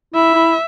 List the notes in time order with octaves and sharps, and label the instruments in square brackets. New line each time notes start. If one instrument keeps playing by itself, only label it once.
[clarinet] E4 [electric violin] E5
[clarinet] E4